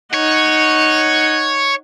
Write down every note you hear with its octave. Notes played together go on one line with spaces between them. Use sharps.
D#4 C#5 F#5